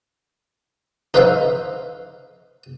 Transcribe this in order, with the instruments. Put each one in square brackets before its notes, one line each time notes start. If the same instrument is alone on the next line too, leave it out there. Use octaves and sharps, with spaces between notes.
[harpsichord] D#4 B4 C5 E5 F5